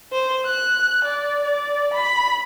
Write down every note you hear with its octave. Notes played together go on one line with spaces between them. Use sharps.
C5
F#6
D5
D5
B5